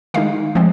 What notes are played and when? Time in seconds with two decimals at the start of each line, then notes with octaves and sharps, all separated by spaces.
0.14 D#3 G#3 D#4 F5
0.55 F3 G#3 C4